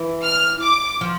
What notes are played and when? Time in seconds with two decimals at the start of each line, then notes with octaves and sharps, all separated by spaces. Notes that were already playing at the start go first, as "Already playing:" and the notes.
Already playing: E3
0.24 F6
0.62 D6
1.01 F3